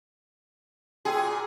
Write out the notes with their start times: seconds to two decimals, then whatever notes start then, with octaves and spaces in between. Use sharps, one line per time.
1.05 A#2 F#4 G#4 G5 E6